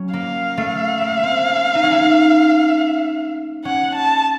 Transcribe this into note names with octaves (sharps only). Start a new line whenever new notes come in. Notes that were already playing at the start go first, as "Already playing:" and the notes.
Already playing: F#3 C#4
A#3 F5
A3
A#3
C4
C#4
D#4
C#4
D#4
C#4 F#5
A5